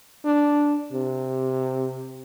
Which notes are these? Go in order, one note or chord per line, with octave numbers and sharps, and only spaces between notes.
D4
C3